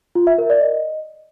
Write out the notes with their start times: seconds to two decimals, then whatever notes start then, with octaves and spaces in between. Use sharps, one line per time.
0.15 F4
0.27 E5
0.38 A#4
0.50 D5
0.61 D#5